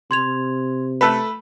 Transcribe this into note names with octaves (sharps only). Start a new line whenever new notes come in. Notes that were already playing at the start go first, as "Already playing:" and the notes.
C3 C6 G#6 F7
A3 A4 B4 B5